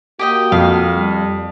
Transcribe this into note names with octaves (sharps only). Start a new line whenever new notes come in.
A#3 F#4 G4 D#5 G5
F2 F5
G3